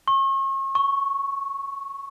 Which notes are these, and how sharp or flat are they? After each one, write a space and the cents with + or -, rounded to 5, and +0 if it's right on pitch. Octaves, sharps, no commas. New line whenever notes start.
C#6 -40
C#6 -5